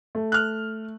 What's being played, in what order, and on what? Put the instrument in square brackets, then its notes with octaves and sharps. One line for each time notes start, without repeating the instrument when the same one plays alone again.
[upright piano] A3
[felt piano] F6 F#6